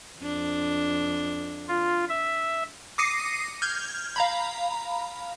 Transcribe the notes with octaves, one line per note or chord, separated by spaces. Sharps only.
F2 D4
F4
E5
D6 D#6 A#6 C7 C#7 D#7
F6 G6 G#6
F5 A#5 B5